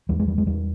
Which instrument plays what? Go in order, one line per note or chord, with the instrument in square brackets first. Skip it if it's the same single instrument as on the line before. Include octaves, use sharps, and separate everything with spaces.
[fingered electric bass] E2 G3
G#3
G3
G#3
E2 G3